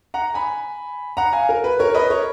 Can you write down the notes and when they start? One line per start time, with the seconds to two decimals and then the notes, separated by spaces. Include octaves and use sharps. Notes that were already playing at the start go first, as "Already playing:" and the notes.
0.14 F#5 A#5
0.34 G#5 B5
1.17 F#5 A#5
1.33 F5 G#5
1.49 A#4
1.64 B4
1.79 A#4 C#5
1.90 C#5
1.94 B4 D#5
2.10 A#4 C#5